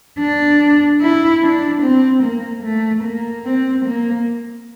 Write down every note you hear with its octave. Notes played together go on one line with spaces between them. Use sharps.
D4
E4
D4
C4
A#3
A3
A#3
C4
A#3